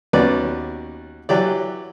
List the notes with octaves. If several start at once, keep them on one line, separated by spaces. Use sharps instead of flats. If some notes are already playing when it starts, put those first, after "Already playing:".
D#2 B3 C#4 F#4 B4 D5
E3 F#3 G4 D5